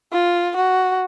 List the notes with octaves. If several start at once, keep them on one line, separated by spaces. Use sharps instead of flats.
F4
F#4